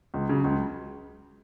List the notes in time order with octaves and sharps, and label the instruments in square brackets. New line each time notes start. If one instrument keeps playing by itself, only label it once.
[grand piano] C#2
C#3 F#3
C#2